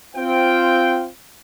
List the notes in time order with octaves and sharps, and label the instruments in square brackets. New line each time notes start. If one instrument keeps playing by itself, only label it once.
[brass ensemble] C4 F4 G5